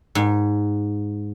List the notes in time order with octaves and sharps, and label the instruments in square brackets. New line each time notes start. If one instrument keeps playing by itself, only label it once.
[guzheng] G#2